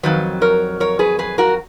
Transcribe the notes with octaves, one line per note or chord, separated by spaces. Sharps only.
F2 D#3 F#3 B4
A#4 C#5
A#4 C#5
G#4 B4
G#4 B4
F#4 A#4